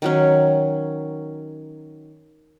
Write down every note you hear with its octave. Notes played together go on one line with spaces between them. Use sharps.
D#3 F#3 C#4